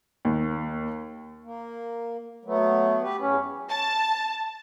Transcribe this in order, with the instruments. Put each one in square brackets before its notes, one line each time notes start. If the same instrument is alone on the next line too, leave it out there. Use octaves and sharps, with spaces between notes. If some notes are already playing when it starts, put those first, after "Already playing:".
[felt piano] D#2
[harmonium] A#3
[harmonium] F#3 B3 [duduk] A3
[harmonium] G4 B4
[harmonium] E2 [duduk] C#4
[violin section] A5